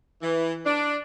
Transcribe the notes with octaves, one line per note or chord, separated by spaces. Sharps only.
E3
D4